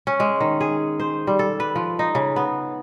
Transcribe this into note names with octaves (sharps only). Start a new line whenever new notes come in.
C#4
G#3
D#3
G#4
C5
G3
A4
B4
F3
D#4
C#3
B3